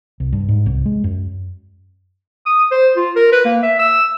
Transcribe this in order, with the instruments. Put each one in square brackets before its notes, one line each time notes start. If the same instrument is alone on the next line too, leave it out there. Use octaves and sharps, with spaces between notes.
[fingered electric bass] C2
G2
G#2
C2
G#3
F#2
[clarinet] D#6
C5
F4
A#4
B4
A#3
E5
E6